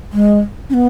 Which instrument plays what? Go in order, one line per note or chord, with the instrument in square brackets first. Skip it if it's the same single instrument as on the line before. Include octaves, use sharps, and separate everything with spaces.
[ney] G#3
C#4
B3